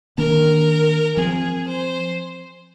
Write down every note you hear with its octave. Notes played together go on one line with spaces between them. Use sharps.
D#3 A#3 D4 A#4
F3 C4 G#4
C5